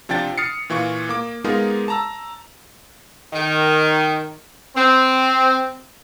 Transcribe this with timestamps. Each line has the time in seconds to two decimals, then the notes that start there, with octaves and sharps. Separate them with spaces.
0.09 C3 F3 D4 G5 A6
0.38 D#6 F6 A6 C7 C#7
0.70 A#2 E3 F4 C#6
1.09 A#3 D6
1.44 G#3 B3 D#4 F4 G#4 A#4
1.88 A5 A#5 E6
3.33 D#3
4.75 C4